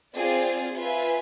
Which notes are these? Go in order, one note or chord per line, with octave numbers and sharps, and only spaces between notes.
C4 F4 G#4 D5
F4 B4 E5 G#5